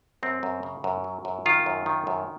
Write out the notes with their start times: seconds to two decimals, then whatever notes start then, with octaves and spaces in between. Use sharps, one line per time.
0.23 F#2 C4
0.43 F#2
0.63 C#3
0.84 F#2
1.04 F#3
1.25 F#2
1.46 D#3 F4
1.66 F#2
1.86 D#3
2.07 F#2